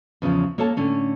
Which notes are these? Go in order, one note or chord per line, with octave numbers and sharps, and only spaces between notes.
E2 C#3 E3 F3
A#3 A4 C#5 A5
A2 D3 C#4